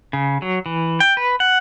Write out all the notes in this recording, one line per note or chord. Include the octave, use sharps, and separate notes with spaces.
C#3
F#3
E3
G5
B4
F#5